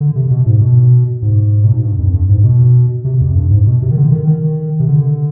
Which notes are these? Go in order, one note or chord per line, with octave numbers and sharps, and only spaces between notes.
D3
C3
B2
G#2
B2
G#2
B2
G#2
G2
F2
G2
G#2
B2
C3
F2
G2
G#2
B2
C3
D#3
D3
D#3
D#3
C3
D3